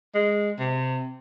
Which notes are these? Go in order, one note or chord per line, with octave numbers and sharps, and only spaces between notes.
G#3
C3